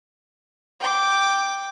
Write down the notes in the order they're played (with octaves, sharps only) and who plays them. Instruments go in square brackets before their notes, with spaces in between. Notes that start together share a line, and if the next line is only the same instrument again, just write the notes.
[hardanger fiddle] G5 D6